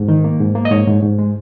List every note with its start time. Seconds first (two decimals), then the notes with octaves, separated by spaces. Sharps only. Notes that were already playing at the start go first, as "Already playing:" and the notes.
Already playing: G#2
0.08 D#3
0.24 A#3
0.40 G#2
0.55 A#3
0.65 D#5
0.71 G#2 C#5
0.87 G#2
1.02 G#2
1.19 G#3